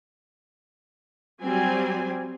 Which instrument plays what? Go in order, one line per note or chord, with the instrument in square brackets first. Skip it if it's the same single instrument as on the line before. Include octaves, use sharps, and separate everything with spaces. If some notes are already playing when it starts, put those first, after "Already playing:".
[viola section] F#3 G3 C4 G#5